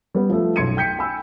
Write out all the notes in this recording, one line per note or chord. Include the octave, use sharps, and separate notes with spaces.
G3 B3
F3 A3
B1 F#2 C6 G#6 C#7 D#7
G5 G6 B6 C#7
G5 G#5 B5 E6